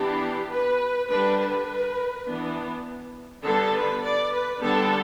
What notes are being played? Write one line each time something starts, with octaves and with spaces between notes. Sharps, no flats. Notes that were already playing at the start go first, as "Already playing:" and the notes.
Already playing: E3 B3 D4 G4
B4
D3 G3 D4 B4
B4
E3 B3 D4
D3 G3 B3 D4 A4
B4
D5
B4
D3 G3 B3 D4 A4